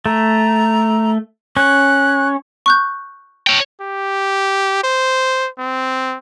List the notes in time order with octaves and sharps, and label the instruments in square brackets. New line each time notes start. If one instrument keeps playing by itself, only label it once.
[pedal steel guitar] A3 [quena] A#5
[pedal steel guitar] C#4 [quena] F#6
[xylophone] C#6 F#6 G6
[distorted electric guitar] C#5 G5
[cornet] G4
C5
C4